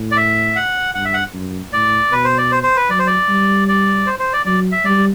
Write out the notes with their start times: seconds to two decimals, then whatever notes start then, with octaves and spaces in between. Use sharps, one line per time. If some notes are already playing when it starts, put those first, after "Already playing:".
Already playing: A2
0.11 D5
0.17 E5
0.56 F#5
0.95 G2 F#5
1.05 E5
1.14 F#5
1.33 F#2
1.72 A2 D5
2.11 B2 B4
2.24 C5
2.38 D5
2.51 C5
2.63 C5
2.77 B4
2.90 F#3 D5
2.99 C5
3.07 D5
3.29 G3
3.68 D5
4.07 C5
4.19 C5
4.33 D5
4.46 F#3 D5
4.72 E5
4.85 G3 D5